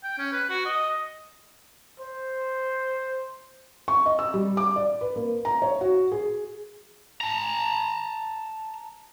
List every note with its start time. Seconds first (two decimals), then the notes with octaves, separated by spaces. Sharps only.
0.04 G5
0.18 C#4
0.32 B4
0.49 F#4
0.65 D#5
2.00 C5
3.88 C#6
4.06 D#5
4.19 E6
4.34 G3
4.57 D6
4.76 D5
5.01 B4
5.16 A#3
5.45 A#5
5.62 C#5
5.81 F#4
6.12 G#4
7.21 A5 A#5